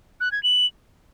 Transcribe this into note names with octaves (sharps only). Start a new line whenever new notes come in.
F#6
G#6
F#7